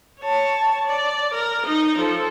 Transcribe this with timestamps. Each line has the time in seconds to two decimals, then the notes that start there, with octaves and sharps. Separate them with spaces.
0.20 C#5 A5
0.87 D5
1.33 A#4
1.65 D#4 D#5
1.98 F3 A4